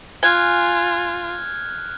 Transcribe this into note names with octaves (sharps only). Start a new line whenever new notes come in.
F4 G#5 F6 F#6 G#6